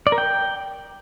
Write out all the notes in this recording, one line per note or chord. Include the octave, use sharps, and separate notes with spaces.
D5
A#4
G5